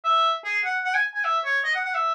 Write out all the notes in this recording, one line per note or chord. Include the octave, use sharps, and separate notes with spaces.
E5
G#4
F#5
F#5
G#5
G#5
E5
C#5
D#5
F#5
F#5
E5